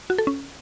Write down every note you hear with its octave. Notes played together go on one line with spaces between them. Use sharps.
F#4
A4
C#4